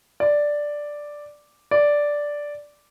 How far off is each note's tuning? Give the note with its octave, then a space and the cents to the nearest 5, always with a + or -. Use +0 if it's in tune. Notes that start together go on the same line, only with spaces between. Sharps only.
D5 +0
D5 -5